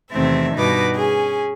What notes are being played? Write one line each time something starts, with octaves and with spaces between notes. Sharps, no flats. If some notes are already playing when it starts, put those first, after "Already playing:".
E2 C3 D#3 A3 C4 E5
G2 B2 D#4 F#4 B4 D6
C#4 G#4